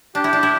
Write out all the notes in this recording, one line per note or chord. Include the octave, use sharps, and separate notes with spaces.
D4 G4
E4
D4
E4